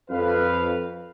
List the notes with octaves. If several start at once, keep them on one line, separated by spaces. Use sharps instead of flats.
F2 B4 F5